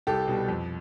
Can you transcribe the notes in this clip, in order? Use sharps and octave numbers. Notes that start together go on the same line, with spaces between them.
C2 G4 A4
B2 G3
F2